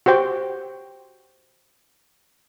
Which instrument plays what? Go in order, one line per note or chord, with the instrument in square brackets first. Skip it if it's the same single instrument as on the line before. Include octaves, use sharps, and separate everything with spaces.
[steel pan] F#4 G4 C5 G5